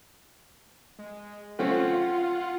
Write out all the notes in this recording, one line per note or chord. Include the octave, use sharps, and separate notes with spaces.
G#3
A3 C4 C#4 F4 F#5